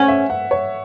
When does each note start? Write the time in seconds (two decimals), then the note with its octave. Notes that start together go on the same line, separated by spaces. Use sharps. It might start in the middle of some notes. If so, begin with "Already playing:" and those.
Already playing: C#4 F#5
0.08 E5
0.30 F#5
0.51 C#5